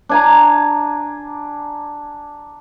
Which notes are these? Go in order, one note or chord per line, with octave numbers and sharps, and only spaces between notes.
D4 G#5 A#5